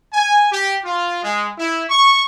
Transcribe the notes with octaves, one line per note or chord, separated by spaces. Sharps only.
G#5
G4
F4
G#3
E4
C#6